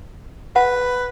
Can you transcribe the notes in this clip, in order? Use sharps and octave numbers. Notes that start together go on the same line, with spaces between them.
B4 F#5